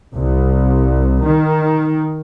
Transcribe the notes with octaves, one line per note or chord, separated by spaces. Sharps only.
C2
D#3